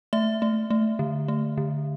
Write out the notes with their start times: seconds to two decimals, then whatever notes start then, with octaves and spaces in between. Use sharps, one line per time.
0.13 A3 E5
0.42 A3
0.70 A3
0.99 D3
1.28 A3
1.58 D3